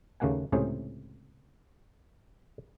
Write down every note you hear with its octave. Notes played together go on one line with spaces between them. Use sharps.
D#2 C#3 A3 A#3 F#5 G#5
C#2 A2 C3 C#4 G#4 C5